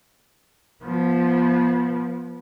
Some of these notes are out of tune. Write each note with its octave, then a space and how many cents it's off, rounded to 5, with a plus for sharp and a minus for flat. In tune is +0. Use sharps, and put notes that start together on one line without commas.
F3 +0 B3 -30